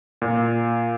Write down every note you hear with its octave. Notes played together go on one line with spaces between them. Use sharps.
A#2